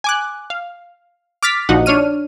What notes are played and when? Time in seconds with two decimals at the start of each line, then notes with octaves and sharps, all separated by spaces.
0.04 G#5 D6 F#6
0.50 F5
1.43 D6 F6 A6 B6
1.69 A#1 F3 D#4 F#4 F#5
1.86 D4 C#5 F6 D#7